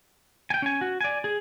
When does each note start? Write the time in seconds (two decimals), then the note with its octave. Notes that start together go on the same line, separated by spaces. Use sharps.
0.50 G5 G#5
0.62 C#4 G#5
0.81 F#4
1.01 D5 G#5
1.24 G#4